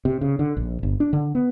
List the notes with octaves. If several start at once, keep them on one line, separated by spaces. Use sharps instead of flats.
C3
C#3
D3
A#1
G1
D4
D3
B3